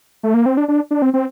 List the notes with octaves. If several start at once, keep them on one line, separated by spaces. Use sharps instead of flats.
A3
A#3
C4
D4
D4
D4
C4
C4